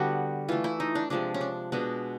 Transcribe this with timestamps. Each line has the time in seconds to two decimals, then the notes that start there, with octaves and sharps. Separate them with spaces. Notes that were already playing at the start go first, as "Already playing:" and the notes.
Already playing: D3 G3 B3 F#4
0.49 E3 A3 F4
0.64 E4
0.80 D#4
0.95 D4
1.10 C3 F3 G#3 D4
1.34 C#4
1.41 D4
1.72 B2 G#3 B3 D4